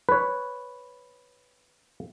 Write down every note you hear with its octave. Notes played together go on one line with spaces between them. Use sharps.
B4 C#5